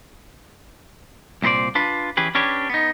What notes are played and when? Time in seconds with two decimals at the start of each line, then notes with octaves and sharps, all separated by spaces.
1.42 C2 A#2 D#4 C5 D5
1.75 D4 F4 B4
2.17 E3 C#4 G4 G#4 B4
2.35 C#4 D4 G4 B4 C#5
2.70 B3 D#4